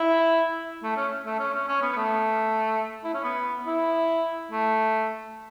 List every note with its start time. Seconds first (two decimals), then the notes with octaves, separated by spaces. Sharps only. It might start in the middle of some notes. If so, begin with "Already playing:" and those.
Already playing: E4
0.83 A3
0.97 C#4
1.26 A3
1.39 C#4
1.54 C#4
1.68 C#4
1.82 B3
1.92 B3
1.96 A3
3.04 E4
3.14 C#4
3.24 B3
3.67 E4
4.51 A3